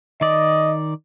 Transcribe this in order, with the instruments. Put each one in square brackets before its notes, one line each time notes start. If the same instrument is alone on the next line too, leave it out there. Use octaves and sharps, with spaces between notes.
[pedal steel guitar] D#3 D5 [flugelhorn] D#5